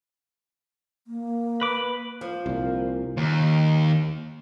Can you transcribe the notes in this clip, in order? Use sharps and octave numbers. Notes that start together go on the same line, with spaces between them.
A#3
B4 D6
F3
C2 A#2
D#2